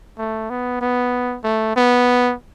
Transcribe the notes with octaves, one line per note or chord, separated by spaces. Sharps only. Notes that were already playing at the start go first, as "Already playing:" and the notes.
A3
B3
B3
A3
B3